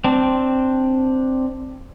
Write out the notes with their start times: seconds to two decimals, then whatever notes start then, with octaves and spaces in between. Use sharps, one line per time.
0.04 C4 D4